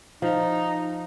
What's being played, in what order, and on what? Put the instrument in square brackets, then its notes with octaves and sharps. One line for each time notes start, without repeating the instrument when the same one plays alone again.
[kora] F3 [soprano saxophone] D#4